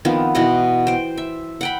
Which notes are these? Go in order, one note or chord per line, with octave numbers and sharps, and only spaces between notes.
D#3 F3 B3 C4
B2 E3 D#5 F#5
C5 G5
E5
F#5 G5 B5